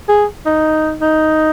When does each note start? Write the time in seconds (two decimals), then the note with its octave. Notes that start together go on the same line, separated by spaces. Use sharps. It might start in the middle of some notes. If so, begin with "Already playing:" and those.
0.08 G#4
0.46 D#4
1.01 D#4